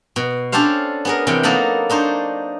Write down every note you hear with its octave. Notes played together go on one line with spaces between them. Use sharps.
B2
C#4 D4 G4 A4 C5 F5
B3 G#4 A#4
C3 E3 B3 G5
F#3 A#3 B3 D#4 A4 B5
D4 D#4 C5 C#5